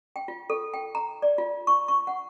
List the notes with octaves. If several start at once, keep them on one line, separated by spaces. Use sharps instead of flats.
G5
F4
A4
G5
A#5
D5
F4
C#6
C#6
F#5